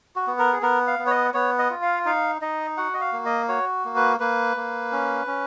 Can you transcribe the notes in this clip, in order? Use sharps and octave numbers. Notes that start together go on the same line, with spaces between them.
F#4
B3
A#4
G#4
B3 A#4
F5
B3
C#5
D#5
B3 C#5
D#5
F4
F5
D#4 F5
D#4 D#5
F#4 F#5
D#5
F5
A#3
D#5
F#4 C#5
A#3
B4
A#3 B4
A#3
C#4
C#4